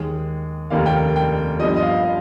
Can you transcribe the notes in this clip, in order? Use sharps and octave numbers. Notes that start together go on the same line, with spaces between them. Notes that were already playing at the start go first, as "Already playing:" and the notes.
Already playing: D#2 D#3 G#3 G#4
F1 D#2 D#3 A#3 F5
G5
G5
G1 G2 F3 D#5
D#5
F5
D#5